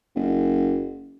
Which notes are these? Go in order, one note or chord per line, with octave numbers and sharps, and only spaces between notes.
F#1